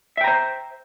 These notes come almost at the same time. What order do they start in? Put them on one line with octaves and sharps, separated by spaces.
E5 G5 A#5 C5